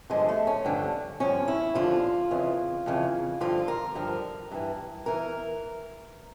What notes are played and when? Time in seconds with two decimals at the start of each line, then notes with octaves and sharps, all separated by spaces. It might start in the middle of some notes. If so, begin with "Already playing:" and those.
0.10 G2 D3 F3 G#3
0.29 A3
0.47 C#4
0.65 G2 D3 F3
1.20 G2 D3 F3 C#4
1.48 E4
1.75 G2 D3 F3 F4
2.31 F2 C#3 E3
2.86 F2 C#3 E3
3.41 G2 D3 F3 F4
3.68 A#4
3.95 G2 D3 F3
4.51 G2 E3
5.06 E3 A#4